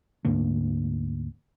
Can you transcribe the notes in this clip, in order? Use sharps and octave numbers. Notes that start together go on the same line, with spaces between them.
D2 G#2 D3 A#3